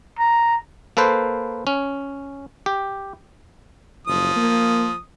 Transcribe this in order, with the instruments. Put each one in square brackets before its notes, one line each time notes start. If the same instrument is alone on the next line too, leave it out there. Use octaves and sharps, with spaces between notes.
[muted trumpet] A#5
[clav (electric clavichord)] A#3 A4 B4 C5
C#4
G4
[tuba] F#1 [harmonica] F3 D#6
[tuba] A#3